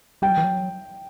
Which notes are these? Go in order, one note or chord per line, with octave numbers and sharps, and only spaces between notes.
G3 G5
F#3
E3
F#3